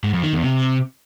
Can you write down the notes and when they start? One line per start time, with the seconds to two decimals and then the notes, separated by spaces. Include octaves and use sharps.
0.04 G#2
0.14 F2
0.23 D#3
0.33 E2
0.43 C3